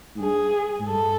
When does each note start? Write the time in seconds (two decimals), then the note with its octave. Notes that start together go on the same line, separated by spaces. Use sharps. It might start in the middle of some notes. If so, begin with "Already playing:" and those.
0.15 G#2
0.20 G2 G#4
0.79 G#2
0.88 G2 A4